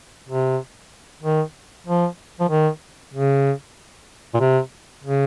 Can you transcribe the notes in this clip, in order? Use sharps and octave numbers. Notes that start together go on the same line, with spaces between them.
C3
D#3
F3
F3
D#3
C#3
A#2
C3
C#3